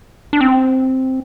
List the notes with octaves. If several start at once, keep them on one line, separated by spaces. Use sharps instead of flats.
D4
C4